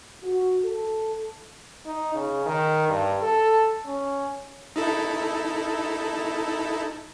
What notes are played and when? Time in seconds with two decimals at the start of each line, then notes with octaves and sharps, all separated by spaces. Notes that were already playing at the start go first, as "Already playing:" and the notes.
0.23 F#4
0.65 A4
1.86 D#4
2.14 C#3
2.46 D#3
2.88 G2
3.22 A4
3.85 C#4
4.76 D#4 E4 A4